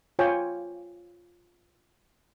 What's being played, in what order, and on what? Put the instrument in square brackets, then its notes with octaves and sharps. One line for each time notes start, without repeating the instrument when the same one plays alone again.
[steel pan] F4 C#5 G5 G#5